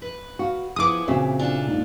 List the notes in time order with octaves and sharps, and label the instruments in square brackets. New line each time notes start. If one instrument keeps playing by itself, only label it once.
[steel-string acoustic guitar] B4
[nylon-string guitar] F#4 [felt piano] F5
[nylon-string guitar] F3 [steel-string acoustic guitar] B3 E4 G#4 [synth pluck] D6 D#6
[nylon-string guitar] A#2 C#3 E5 [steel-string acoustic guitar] E3 [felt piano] C4 F#4
[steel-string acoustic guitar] D4 F4 A4
[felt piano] D#2 G#2